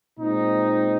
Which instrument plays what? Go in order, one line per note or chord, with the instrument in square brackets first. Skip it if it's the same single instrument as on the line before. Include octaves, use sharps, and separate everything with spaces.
[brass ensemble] A#2 G#3 C4 D#4